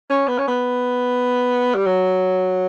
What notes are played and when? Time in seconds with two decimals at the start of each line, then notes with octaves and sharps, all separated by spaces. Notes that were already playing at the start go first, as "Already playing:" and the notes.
0.10 C#4
0.28 B3
0.38 C#4
0.48 B3
1.75 G3
1.86 F#3